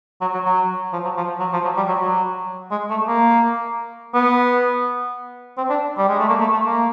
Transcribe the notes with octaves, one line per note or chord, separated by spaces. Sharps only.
F#3
F#3
F#3
F3
F#3
F3
F#3
F3
F#3
G3
F#3
F#3
G#3
A3
A#3
B3
C4
D4
G3
G#3
A3
A#3
A3
A3
A#3